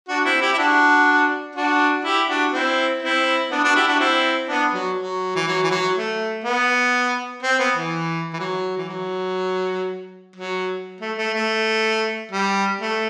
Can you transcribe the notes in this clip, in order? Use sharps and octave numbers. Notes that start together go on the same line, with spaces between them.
D4 F#4
C4 E4
E4 G4
E4
D4 F#4
D4 F#4
E4 G4
D4 F#4
C4 E4
C4 E4
B3 D4
D4 F#4
E4 G4
D4 F#4
C4 E4
B3 D4
F#3
F#3
E3
F#3
E3
F#3
A3
B3
C4
B3
E3
E3
F#3
E3
F#3
F#3
A3
A3
A3
G3
A3